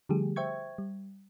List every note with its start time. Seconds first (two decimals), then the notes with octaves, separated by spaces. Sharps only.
0.09 D3 F3 G3 A3 G4 G#4
0.36 C5 E5 G5 C#6 G#6
0.78 G3